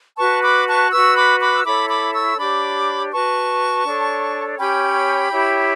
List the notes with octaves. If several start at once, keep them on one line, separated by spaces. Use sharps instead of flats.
F#4 B4 A5 C#6
B5 D6
A5 C#6
F#4 B4 C#6 E6
B5 D6
B5 D6
E6
E4 A4 C#5 B5 D6
B5 D6
C#6 E6
D4 G4 C#5 B5 D6
F#4 B4 A5 C#6
D4 A4 C#5
C#4 G4 C#5 G5 B5
E4 G4 C#5